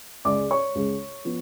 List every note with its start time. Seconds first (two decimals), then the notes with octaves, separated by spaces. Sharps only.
0.25 C#2 C#3 G#3 D5 D6
0.51 C#5 C#6
0.75 C#2 C#3 G#3
1.25 F3 B3